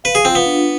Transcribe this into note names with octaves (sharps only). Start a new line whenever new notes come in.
B4 F5
G#4
C4 F4
B3
D4